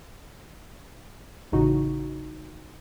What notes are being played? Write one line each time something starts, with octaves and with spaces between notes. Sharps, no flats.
A1 A2 C#3 D#4 F#4